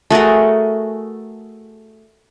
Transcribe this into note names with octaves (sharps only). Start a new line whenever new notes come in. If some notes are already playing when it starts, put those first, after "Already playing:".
A3 F#4 G#4 A#4